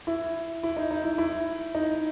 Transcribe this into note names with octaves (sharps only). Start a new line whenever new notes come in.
E4
E4
D#4
D#4
E4
E4
D#4